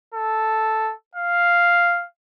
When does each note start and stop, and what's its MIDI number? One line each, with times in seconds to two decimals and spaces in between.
0.14 0.92 69
1.15 2.05 77